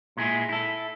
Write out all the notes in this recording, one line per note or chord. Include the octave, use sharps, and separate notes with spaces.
A#2 G#3 E4 G#4
E4 A4